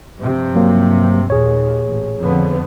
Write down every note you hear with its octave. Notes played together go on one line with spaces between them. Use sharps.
G2 C3 F3
F#3 A#3
D#2 A#2 G#4 C#5
A1
F2 D3 B3